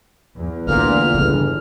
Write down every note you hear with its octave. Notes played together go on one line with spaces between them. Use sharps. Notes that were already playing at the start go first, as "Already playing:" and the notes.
E2
D2 A#2 D3 F4 F6
G1 C#3